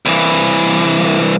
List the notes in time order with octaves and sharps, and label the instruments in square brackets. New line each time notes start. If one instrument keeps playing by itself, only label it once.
[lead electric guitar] C2 E3